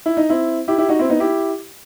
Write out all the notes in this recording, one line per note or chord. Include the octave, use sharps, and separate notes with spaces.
E4
D#4
C4 E4
E4 G4
E4 G4
D#4 F#4
C4 E4
B3 D#4
E4 G4